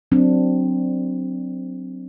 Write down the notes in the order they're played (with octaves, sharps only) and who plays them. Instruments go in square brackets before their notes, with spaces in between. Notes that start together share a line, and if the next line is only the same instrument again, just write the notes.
[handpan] F#3 C4 D4